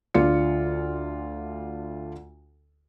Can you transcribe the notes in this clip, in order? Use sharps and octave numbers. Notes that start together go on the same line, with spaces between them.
D2 D3 F4 D5 C#7